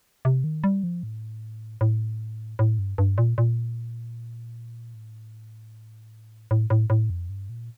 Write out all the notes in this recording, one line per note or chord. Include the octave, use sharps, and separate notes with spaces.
C3
D#3
G3
F3
A2
A2
A2
G2
G2
A#2
A#2
A2
A2
A2
A2
F2
G2
A#2